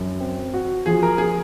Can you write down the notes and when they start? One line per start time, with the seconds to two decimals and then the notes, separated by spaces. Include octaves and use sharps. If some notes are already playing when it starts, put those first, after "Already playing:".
Already playing: F#2
0.20 C4
0.54 F#4
0.86 F3 G#4
1.03 A#4
1.18 G#4